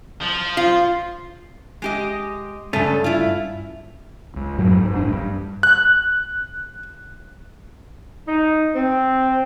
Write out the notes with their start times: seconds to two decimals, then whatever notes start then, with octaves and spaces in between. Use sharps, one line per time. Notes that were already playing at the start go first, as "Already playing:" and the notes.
0.22 F3
0.57 F4
1.82 G#3 G4 D#5
2.73 G2 C#3 A3 C#4 A4
3.04 E4 F4
4.36 C#2
4.58 F#2 A2 F#3
4.78 G#2
4.96 D1 A1 D4
5.07 G2
5.63 F#6
8.27 D#4
8.76 C4